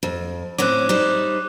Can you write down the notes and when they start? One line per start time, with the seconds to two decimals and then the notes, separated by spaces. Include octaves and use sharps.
0.03 F2
0.58 A2 C4 C#4 D6 F#6
0.89 G3 D#4 C5